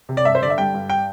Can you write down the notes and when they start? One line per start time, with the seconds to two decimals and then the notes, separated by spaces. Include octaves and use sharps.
0.09 C3
0.17 D5
0.25 G2 E5
0.35 C5
0.42 D3 D5
0.50 E5
0.58 G3 G5
0.74 G2
0.90 G5